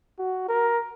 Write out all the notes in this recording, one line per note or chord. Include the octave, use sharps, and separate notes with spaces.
F#4
A#4